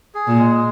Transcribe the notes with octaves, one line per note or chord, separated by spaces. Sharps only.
G#4
A#2
G#3